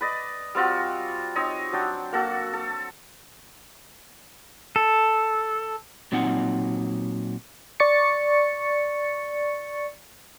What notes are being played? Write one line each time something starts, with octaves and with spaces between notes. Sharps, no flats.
B4 D5 D#5
G3 C4 F4 F#4
C4 D#4 C#5 D#5
F#3 D4 G5
A#3 F#4 A4
A4
A4
A#2 F#3 C4 D#4 F#5
D5 C#6 A6 C#7